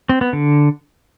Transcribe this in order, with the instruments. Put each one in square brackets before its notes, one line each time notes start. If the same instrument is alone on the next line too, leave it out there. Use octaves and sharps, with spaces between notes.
[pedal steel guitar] C4
B3
D3